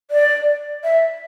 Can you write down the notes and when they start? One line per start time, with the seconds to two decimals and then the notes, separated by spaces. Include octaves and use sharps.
0.11 D5
0.84 E5